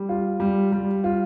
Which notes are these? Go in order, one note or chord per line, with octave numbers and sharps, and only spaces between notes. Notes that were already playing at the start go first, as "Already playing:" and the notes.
Already playing: G3
F4
G3
G3
F4